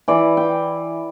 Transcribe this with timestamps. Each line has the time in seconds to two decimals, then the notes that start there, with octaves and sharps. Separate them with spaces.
0.08 E3 D5
0.37 G5